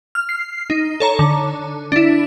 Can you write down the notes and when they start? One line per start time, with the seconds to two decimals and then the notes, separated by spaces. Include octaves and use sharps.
0.15 F6
0.29 C7
0.70 D#4
1.00 A4 C#5 A#5
1.19 D3
1.92 D4 E4